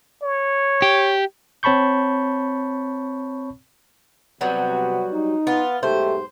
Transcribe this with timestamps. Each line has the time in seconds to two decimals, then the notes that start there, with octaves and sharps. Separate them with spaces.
0.23 C#5
0.82 G4
1.63 C4 C#5 A5 B5 C#6 G6
4.41 C3 F#3 G3 B3 F#4
5.12 D#4
5.47 B3 F4
5.83 B1 G#2 A3 G4 C5